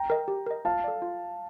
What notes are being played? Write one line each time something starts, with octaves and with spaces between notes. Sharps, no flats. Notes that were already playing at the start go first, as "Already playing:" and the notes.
Already playing: G5 A#5
A#4 D#5
G4
A#4 D#5
F4 F5 A5
A4 D5
F4